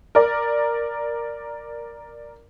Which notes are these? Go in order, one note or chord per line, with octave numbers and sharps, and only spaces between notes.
A#4 D5